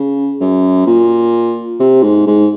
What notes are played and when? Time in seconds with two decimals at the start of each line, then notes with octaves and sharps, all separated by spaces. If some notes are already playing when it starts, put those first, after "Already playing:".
Already playing: C#3
0.40 F#2
0.87 A#2
1.80 C3
2.03 G#2
2.27 G#2